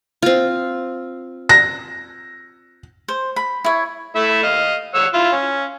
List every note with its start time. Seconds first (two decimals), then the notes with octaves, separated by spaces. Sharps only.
0.22 C4 F4
1.49 A#6
3.08 C5
3.36 B5
3.65 E4 C#5
4.16 A3 E4 E5
4.43 D#5 F5
4.95 C#5 F#5 E6
5.14 E4 F4
5.32 C#4